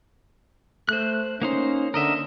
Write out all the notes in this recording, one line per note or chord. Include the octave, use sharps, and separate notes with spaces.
A3 C5 F#6
A#3 C#4 D#4 C5
D3 A#4 D#5 E5